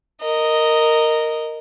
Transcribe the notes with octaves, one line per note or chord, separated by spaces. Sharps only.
A#4 D#5